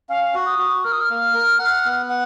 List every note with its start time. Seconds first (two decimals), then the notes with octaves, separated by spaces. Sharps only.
0.09 C#4 F5
0.34 F#4
0.46 D#6
0.59 F#4
0.84 A#4 F6
0.92 D#6
1.01 F6
1.10 A#3
1.34 A#4
1.59 F#5
1.85 B3
2.10 F#5